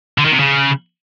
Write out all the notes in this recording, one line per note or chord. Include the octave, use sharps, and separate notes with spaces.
D3
D#3
C3
C#3